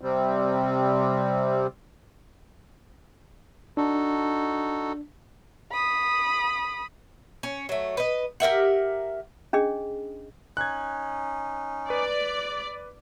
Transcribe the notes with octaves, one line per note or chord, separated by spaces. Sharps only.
C3 G3 C4
D4 D#4 F#4 A4
B5 D#6
C#4
F#3 A3
B4 D#5
G4 A#4 E5 F#5
C#4 D4 G#4 D#5
C#4 D#4 F#6 G#6
B4 D5